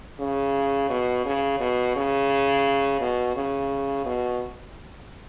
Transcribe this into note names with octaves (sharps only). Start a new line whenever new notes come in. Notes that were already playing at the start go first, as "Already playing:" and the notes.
C#3
B2
C#3
B2
C#3
B2
C#3
B2